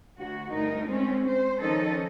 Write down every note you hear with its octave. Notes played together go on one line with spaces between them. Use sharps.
D2 F#4
D2 G2 D#4 A#4
G#3 C4 C#4
C5
D#3 F3 C#4 D#4 A4 D#5